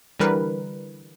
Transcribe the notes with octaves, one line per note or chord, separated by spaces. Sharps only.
D3 E3 G3 A#4 B4